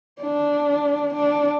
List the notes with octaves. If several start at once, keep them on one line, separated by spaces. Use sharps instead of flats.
D4
D4